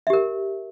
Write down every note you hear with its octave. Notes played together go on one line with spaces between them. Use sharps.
G4 A#4 E5